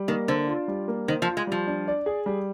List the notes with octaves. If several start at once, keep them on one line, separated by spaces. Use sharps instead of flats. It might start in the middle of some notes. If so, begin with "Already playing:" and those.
Already playing: G3
D#3 A#3
D3 C5
F4
G3
A#3
D#3 C5
F3
F4
G#3
F3 G3
D4
D5
G#4
G3